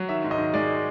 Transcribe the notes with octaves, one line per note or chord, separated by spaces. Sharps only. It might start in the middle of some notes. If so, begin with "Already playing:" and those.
Already playing: F#3
D#3 E5
G#2
D#5
D#3
G#3 D5